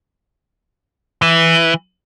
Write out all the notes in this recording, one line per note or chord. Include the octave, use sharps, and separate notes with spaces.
E3